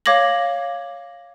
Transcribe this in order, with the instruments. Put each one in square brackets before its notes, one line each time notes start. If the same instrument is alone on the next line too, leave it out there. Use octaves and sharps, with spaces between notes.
[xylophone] C#5 F5 D6 G#6 A#6 F#7